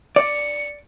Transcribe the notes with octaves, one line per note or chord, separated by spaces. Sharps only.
D5 C#7